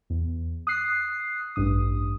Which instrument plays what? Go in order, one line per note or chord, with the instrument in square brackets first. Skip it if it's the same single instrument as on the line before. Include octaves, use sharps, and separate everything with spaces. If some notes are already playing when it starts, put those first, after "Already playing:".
[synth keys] E2
D#6 F#6 C7
A1 G2 D#6